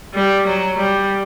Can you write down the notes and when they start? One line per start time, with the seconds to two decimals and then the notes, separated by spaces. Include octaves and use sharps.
0.14 G3
0.47 F#3
0.78 G3